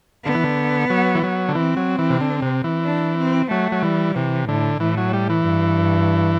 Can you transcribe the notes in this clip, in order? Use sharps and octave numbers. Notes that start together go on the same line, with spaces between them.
D3 B3
E3
D3
F#3
E3
F#3
D3
E3 C4
F#3
E3
C3
D3
C3
E3
D4
C4
F#3 A3
F#3
E3 G3
C3 E3
A2 D3
A2 E3
F#3
G3
E3
G2